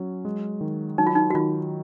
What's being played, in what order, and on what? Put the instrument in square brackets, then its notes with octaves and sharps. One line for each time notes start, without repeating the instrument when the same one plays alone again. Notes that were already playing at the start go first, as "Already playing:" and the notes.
Already playing: [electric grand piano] F#3 C#4
G#3
D#3
[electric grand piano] F#3 [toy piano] D#4
[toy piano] F4
D#4
F#4
[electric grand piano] D#3 [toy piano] F4